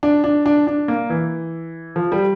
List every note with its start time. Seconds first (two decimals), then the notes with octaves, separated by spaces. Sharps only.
0.03 D4
0.24 D4
0.46 D4
0.67 D4
0.88 A#3
1.10 E3
1.96 F3
2.12 G3